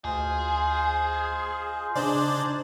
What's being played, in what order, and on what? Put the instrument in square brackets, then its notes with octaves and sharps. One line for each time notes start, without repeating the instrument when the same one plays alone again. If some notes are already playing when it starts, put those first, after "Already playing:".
[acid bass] D2 [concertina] F4 C5 D#5 [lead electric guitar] G#4
[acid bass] C#3 [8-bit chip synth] D4 C5 D5 [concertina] D#4 G#5 A#5